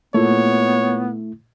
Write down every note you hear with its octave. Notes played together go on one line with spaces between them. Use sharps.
A#2 A3 B3 E4 C#5